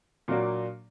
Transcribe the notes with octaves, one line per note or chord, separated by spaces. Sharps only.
A#2 F#3 A#3 D4 F#4